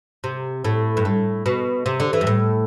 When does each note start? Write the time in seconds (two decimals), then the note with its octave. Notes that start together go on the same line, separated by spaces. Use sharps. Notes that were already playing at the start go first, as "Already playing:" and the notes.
0.24 C3
0.65 A2
0.97 G2
1.05 A2
1.46 B2
1.86 C3
2.00 D3
2.13 E3
2.21 G2
2.27 A2